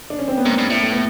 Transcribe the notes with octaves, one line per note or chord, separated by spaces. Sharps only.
D4
C#4
C4
B3
G#2 A#3
G2
A2
A3
B3